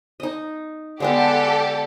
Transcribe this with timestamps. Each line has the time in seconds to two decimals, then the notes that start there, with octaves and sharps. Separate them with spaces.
0.20 D#4 D#5
1.00 D3 G#3 B3 G4 A4